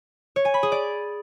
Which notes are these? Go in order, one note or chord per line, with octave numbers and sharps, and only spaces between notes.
C#5
G#5
B5
G#4
D5